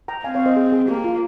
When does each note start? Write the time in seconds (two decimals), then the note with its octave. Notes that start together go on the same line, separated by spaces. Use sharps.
0.08 G5 A#5
0.24 C4 F5 G#5
0.35 C#5 F5
0.46 C5 D#5
0.56 G#4
0.72 G#4
0.88 A#3 G4
1.04 F4